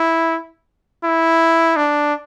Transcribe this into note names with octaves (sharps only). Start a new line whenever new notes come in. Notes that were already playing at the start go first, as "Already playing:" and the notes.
Already playing: E4
E4
D4